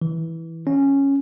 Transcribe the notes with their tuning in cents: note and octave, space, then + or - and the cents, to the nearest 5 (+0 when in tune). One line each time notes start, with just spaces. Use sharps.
E3 -10
C#4 -5